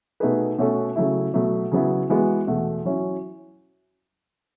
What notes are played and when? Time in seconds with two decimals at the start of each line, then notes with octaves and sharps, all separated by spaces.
0.20 B2 A3 D#4 G#4 B4
0.58 B2 A3 C#4 F#4 A4
0.96 C#3 F#3 A3 E4
1.34 B2 F#3 A3
1.72 C#3 F#3 B3 E4
2.09 E3 G#3 B3 F#4
2.47 E2 B2 A3
2.85 F#3 C#4 E4